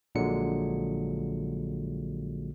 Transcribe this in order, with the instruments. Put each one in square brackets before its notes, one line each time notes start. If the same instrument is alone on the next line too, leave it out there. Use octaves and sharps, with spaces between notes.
[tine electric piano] A#1 A#2 D3 F#3 G#3 C#7